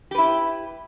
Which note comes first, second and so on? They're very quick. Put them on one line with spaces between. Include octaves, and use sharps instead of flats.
G4 B4 E4